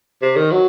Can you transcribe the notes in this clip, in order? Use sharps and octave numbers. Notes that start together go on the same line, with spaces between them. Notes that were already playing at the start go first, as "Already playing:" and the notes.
C3
D#3
F#3